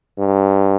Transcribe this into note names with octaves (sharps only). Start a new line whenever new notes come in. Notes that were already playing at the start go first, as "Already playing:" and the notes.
G2